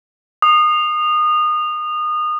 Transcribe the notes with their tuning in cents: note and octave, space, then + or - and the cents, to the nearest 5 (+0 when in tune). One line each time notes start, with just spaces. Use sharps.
D#6 -25